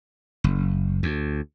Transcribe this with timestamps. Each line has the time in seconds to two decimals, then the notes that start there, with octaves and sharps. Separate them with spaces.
0.44 F#1
1.03 D2